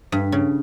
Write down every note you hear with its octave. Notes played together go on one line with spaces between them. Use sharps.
G2
C#3